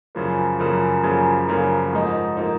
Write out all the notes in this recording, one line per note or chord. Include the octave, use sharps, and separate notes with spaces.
F#2 C#3 F3 A#3
F#2 C#3 F3 A#3
F#2 C#3 F3 A#3
F#2 C#3 F3 A#3
G#2 F3 A#3 D#4
F3 A#3 D#4